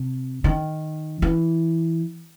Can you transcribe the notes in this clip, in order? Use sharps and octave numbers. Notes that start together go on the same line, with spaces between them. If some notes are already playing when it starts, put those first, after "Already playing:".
Already playing: C3
D#3
E3